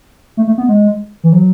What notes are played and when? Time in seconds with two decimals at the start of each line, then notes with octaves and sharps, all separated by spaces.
0.37 A3
0.47 A3
0.58 B3
0.68 G#3
1.23 E3
1.33 F#3